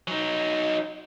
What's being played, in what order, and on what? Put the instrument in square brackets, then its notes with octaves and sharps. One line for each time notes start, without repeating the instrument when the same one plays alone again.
[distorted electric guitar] F#3 D#4